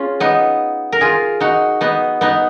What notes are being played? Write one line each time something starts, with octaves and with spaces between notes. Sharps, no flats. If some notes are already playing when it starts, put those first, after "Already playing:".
Already playing: C#4 F4 G#4
B3 D#4
A#4
F4 G#4
D#4 F#4
B3 D#4
B3 D#4